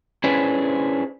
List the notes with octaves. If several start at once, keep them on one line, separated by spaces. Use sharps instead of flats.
C#4 D4 E4 G#4 B4 C5